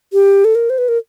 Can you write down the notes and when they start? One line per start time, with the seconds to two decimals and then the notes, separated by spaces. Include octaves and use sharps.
0.13 G4
0.45 A4
0.55 A#4
0.70 C5
0.78 B4
0.88 A#4